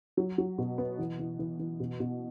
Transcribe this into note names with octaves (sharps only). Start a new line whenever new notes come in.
F#3
F#3
B2
B3
E3
E3
E3
E3
B2
B2